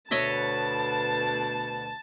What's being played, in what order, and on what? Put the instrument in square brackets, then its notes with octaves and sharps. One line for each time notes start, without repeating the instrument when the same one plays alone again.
[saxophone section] D2 B2 [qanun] C#5 D#5 E5 [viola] A5